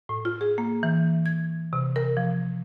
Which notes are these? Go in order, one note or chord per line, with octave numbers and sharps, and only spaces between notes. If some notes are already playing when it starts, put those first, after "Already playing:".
A2
F4
G#4
A#3
E3
G#6
C3
A#4
F3